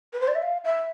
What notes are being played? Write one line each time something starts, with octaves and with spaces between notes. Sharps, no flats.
B4
C5
D5
E5
F5
E5